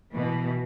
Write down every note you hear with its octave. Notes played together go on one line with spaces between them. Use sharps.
B2 E3